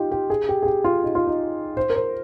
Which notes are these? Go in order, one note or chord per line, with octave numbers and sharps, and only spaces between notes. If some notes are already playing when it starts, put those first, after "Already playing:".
Already playing: D#4 F4 G4
G4
G#4
G4
G#4
G4
F4
D#4
F4
D#4
C5
A#4
C5